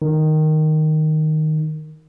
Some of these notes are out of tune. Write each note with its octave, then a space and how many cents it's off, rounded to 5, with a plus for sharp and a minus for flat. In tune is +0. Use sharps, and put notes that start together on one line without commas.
D#3 -5